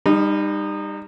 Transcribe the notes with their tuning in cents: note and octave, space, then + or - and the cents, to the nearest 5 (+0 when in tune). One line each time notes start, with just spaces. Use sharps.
G3 +25 D#4 -20